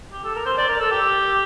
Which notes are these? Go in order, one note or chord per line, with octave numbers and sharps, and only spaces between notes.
G4
A4
A#4
C5
D5
A#4
A4
G4